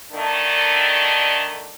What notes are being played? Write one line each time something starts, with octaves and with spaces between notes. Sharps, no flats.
D3 D#3 A3 D4